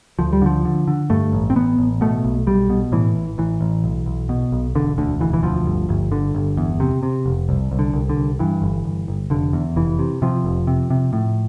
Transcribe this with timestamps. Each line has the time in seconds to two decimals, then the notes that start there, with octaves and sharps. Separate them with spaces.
0.19 D2 F3
0.33 G3
0.42 D3 F3
0.65 D3
0.88 D3
1.10 G2 A3
1.33 A1
1.50 C4
1.56 A1 B3
1.78 A1
2.01 B2 A3
2.24 B1
2.47 B1 G3
2.70 B2
2.92 A2 E3
3.15 A1
3.38 A1 E3
3.61 A1
3.84 B1
4.06 B1
4.29 B2
4.52 B1
4.75 E1 D3
4.98 D2 D3
5.20 E1 E3
5.33 E3
5.43 D2 F3
5.66 G1
5.89 G1
6.12 D3
6.35 G1
6.57 E2
6.80 C3
7.03 C3
7.26 F1
7.49 C2
7.71 C2
7.79 D3
7.94 C2
8.09 D3
8.17 C2
8.39 G2 E3
8.62 G1
8.85 G1
9.08 G1
9.30 F1 D3
9.53 E2
9.76 F1 E3
9.99 C3
10.22 C3 F3
10.45 F1
10.67 C3
10.90 C3
11.13 A2